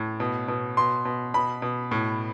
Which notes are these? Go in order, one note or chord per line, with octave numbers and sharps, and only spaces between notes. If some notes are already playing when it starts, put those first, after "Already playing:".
Already playing: A2
B2
B2
B2 C6
B2
B2 B5
B2
A2